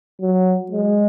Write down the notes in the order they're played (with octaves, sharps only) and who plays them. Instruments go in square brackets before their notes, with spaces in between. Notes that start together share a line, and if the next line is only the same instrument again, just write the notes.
[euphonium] F#3
G#3